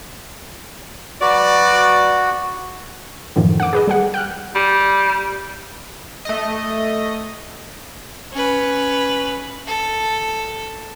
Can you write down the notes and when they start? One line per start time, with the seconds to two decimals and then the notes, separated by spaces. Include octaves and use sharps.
1.21 F#3 F#4 B4 D5
3.36 F#2 A2 D3 D#3 F3
3.60 F#5 D6
3.73 G#4 B4 D#5
3.87 G3 G#4 F#5
4.14 G5 F6 F#6
4.55 G3
6.25 A3 D#5
8.33 C#4 B4
9.67 A4